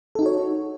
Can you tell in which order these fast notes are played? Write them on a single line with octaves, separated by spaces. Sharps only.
A4 D#4 F#4 C#5